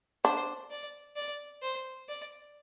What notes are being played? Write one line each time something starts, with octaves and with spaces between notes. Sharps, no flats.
D4 C5
D5
D5
C5
D5